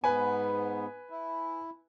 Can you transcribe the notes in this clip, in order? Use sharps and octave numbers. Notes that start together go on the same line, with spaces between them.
G#2 B3 B4 G#5
E4